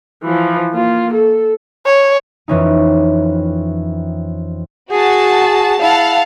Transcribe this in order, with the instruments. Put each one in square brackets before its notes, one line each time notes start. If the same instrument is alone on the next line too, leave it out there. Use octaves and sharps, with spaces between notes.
[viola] E3 F3
A#3 F4
A4
[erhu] C#5
[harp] F2 E3 C#4 D#4
[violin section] F#4 A5 [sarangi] G#4
[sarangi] E4 [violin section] F5 F#5 A5